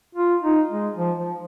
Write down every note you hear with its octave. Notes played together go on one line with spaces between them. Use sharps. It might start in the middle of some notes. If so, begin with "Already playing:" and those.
F4
D#4
G#3
F3
F3